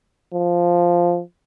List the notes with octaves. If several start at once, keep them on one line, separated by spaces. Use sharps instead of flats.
F3